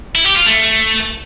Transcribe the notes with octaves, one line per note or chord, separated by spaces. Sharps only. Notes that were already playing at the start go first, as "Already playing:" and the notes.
E4
G4
F4
A3